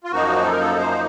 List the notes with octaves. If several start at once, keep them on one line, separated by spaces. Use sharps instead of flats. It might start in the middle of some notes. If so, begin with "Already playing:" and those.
F4
F#2 F3 A#3 D#4 F#4
A4
A#4
A4
C5